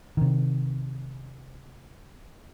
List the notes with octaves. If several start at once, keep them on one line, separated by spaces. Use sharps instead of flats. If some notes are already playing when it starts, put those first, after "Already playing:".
C3 D#3